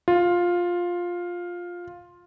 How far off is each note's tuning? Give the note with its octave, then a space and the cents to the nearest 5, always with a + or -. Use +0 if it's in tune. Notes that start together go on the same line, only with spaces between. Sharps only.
F4 +10